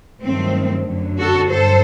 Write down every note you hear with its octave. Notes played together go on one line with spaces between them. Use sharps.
G2 D#3 F#3 A3 C4
F#2 D3 F#3
F#4 A4
G2 F#3 A4 C5